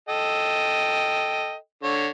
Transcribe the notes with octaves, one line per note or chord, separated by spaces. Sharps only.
A4 D#5 G5
D3 C#5